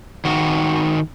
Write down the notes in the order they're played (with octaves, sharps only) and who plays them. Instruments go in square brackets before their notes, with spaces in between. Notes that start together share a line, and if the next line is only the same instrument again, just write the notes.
[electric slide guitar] D#3 F#4